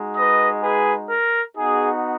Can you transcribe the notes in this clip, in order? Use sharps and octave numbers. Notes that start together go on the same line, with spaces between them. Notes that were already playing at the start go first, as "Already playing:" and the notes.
Already playing: G#3 D#4 F#4
B4 D#5
G#4 B4
A#4
B3 D#4 F#4 G#4